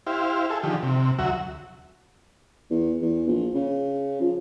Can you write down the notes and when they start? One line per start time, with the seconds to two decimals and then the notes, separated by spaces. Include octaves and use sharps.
0.07 E4 G4 C5 F5
0.50 G#4 A4 E5
0.63 D3 D#3 F3 G4
0.83 C3
1.19 D2 F#3 F#4 E5
2.70 E2
3.02 E2
3.28 A#1
3.55 C#3
4.21 F3